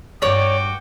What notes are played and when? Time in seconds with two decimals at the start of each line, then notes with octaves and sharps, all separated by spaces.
0.22 E2 G2 F#4 C#5 D5 G5 D6